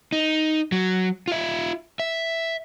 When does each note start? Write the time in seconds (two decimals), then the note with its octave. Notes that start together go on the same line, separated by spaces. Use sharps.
0.12 D#4
0.72 F#3
1.28 F4 E5
2.00 E5